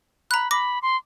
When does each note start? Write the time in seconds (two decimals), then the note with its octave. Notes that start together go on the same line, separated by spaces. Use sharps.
0.31 A#5 B5 F#6
0.51 B5 D6 A#6
0.82 C6